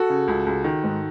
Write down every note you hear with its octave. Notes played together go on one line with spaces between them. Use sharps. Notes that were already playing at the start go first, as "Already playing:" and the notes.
Already playing: F#4 A4
C#3
C#2
C#2
D#3
G#2